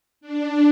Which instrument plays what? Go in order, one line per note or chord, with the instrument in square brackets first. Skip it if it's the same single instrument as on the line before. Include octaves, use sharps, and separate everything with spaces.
[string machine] D4